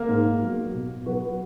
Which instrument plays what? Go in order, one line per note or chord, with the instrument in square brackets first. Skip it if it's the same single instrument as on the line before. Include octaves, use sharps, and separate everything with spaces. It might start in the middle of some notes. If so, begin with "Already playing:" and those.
Already playing: [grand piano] A#3 A#4
[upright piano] G#2
F#3 B3
B2
F#3 B3 F#4 B4